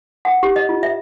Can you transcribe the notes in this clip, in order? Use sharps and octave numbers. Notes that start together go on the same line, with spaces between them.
F#5
G4
D#5
F4
E5